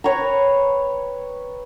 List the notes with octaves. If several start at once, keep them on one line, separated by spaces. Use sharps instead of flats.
B4 C#5 G5 A#5